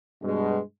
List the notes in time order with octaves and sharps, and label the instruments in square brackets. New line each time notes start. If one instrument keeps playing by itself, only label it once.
[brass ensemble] G2 B2 G#3